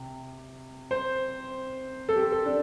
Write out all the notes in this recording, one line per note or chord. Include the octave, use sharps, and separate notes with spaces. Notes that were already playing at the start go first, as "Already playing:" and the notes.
Already playing: C3
C5
A4
G4
A4
A4
D4